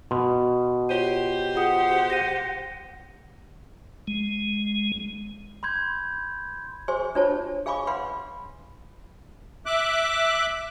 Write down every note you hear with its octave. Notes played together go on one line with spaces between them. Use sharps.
B2 C6
F4 G4 C5 C#5 D#7
F4 G#4 F#5 D#6
A#6 D#7
G#3
B5 C6 G6 G#6
G#4 C5 G#5 C6 C#6
D4 F4 C5 C#5 A5
G#4 F5 G#5 B5 C#6 D6
B4 F5 F#5 B5 C6
E5 D6 F#6